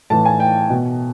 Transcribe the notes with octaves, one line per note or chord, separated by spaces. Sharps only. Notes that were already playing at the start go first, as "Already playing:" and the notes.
A2 E3 A5
G#5
G5
B2